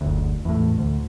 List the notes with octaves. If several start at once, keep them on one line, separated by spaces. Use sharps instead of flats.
F#1 D2
E2 A2
D2